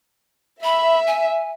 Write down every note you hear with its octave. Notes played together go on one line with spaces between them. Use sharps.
E5 B5
G#5